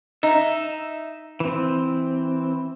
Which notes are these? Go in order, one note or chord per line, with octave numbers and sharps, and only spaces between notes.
D#4 E5
E3 C4